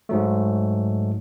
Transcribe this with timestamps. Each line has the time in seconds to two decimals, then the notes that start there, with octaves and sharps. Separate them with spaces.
0.09 G#2 F#3 A3